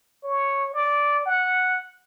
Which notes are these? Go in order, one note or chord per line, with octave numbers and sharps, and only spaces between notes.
C#5
D5
F#5